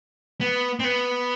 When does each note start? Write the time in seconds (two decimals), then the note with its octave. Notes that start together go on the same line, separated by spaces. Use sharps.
0.41 B3
0.80 C4
0.84 B3